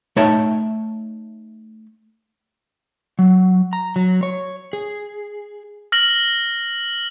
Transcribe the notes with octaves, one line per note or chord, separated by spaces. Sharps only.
A3 D#4 C#5 E5 G5 A5
F#3
A#5
F#3
C#5
G#4
F6 A#6 F#7